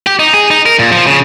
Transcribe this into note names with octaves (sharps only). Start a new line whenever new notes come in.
G4
D#4
G#4
D#4
A#4
A#2
F3
C#3